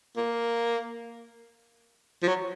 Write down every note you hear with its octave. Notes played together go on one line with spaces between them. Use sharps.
A#3
F3
F#3